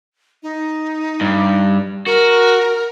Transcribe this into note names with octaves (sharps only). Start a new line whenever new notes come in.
D#4
G2
F#4 A#4